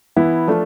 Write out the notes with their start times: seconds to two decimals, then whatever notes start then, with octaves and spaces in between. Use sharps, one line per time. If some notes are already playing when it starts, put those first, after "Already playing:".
0.16 E3 B3 E4
0.48 F3 A3 D4 F4